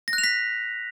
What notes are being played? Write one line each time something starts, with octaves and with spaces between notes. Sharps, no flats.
A#6
F#6
F7
B6